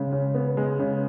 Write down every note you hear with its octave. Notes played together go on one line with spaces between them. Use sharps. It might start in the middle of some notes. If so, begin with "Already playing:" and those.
Already playing: C#3 G#3
C#3
B3
G#3
C#3